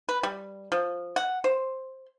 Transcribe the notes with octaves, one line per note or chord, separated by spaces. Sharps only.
B4
G3
F3
F#5
C5